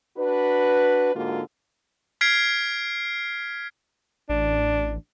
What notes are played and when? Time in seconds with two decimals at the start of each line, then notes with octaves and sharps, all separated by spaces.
0.17 D4 F#4 B4
1.16 G#2 D3 A#3 F4 F#4
2.21 F6 G#6 B6 C7 D7
4.29 A1 D4